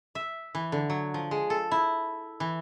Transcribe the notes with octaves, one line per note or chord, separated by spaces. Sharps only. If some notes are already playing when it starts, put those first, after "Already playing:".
E5
E3
D3
F#3
F3
G#3
A4
E4
E3